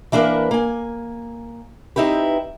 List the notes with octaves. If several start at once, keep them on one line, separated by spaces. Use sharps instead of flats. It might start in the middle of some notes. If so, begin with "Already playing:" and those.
E3 A#3 D4 A#4 B4
A#3 G#5
C4 D#4 E4 G4 B4